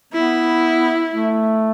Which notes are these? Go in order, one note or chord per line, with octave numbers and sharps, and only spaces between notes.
B3 E4
A3